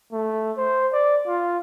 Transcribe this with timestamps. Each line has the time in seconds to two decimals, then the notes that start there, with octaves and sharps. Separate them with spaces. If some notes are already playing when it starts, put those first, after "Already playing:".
0.13 A3
0.58 C5
0.93 D5
1.27 F4